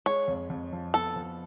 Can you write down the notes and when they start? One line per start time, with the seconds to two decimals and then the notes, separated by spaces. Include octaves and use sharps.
0.06 G#3 C#5
0.28 F2
0.50 F2
0.73 F3
0.94 B3 A4
1.16 F3